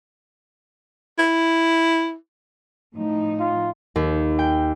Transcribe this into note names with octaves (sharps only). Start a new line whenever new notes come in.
E4
A2 F3 D#4
F4
D#2
G5